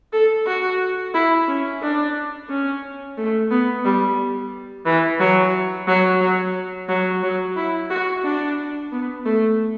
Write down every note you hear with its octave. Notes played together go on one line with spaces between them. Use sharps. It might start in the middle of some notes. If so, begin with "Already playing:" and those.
A4
F#4
E4
C#4
D4
C#4
A3
B3
G3
E3
F#3
F#3
F#3
F#3
F#3
E4
F#4
D4
B3
A3